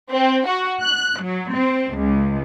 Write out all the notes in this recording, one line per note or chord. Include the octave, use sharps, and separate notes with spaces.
C4
F#4
F#6
F#3
C4
C#2